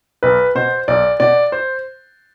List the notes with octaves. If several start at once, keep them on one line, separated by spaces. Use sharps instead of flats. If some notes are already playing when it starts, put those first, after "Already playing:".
B1 B4
B2 C5
B1 D5
B2 D5
C5